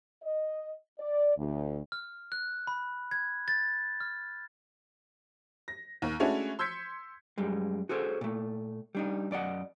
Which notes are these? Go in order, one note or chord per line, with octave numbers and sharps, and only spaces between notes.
D#5
D5
D2
F6
F#6
B5
G#6
A6
F6
A#6
D#2
G#3 A3 C#4 D4 E4 F#4
C6 E6 G6 G#6 B6 C#7
F#2 G3 G#3
F#4 G#4 A4 C5 C#5
A#2 A3
G3 D4 D#4
F#2 D5 D#5 F#5